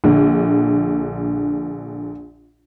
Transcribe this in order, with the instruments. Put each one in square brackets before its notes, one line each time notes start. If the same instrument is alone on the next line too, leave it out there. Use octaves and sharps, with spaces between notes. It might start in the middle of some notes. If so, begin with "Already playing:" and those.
[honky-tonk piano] A#1 D3